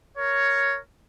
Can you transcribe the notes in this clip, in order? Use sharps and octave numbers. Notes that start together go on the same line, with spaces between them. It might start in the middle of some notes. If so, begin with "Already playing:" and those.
A#4 C#5